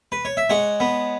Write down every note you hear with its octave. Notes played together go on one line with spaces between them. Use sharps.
B4
C#5
E5
G#3 C#5 F#5
B3